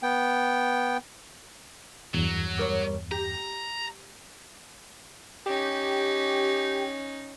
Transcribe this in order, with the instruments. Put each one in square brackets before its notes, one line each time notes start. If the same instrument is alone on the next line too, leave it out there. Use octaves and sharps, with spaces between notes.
[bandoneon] B3 G5
[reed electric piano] E2 G2 [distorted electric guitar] F#3
[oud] G3 A#4 C#5
[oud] G4 [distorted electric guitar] A#5
[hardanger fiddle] C#4 D#4 [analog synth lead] G4